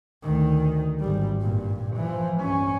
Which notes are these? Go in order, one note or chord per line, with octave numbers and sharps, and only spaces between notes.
D2 D#3
G#1 G3
G2 A#2
E3 F3
G2 C#4